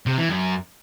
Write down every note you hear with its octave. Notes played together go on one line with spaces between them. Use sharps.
C3
E3
F#2